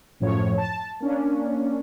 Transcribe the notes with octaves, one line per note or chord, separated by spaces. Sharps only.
F#2 A2 F3 C#5
A5
A#3 C#4 D4